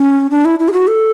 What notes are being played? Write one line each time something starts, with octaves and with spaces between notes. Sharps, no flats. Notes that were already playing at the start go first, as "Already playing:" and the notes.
Already playing: C#4
D4
E4
E4
G#4
F#4
A4